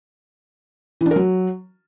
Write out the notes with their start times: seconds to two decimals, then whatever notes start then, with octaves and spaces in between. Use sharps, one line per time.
1.01 E3
1.06 D4
1.11 A#4
1.16 F#3